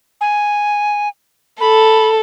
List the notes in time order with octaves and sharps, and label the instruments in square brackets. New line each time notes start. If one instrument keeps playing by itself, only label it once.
[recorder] G#5
[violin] A4 [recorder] B5